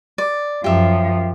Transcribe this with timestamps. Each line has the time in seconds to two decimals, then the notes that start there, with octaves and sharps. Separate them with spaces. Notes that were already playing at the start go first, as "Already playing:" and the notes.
0.18 D5
0.64 F#2 F3 G4 E5